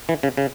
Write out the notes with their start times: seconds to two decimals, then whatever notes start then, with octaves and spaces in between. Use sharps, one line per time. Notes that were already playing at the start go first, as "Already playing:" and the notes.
0.09 E3
0.23 C#3
0.37 C#3